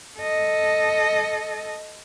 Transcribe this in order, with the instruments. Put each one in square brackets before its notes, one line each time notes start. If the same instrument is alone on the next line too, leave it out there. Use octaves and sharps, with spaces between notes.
[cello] A4 D#5